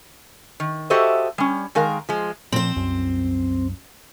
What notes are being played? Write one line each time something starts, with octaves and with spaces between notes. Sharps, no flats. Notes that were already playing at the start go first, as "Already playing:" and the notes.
D#3
F#4 G4 A4 C5 D#5 E5
G3 C#4
D#3 G#3 A#4 F5
F3 G#3
A#2 F3 C4 C5
C2 F#2